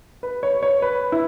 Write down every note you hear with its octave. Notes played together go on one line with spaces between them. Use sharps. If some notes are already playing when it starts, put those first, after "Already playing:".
B4
C#5
C#5
B4
E4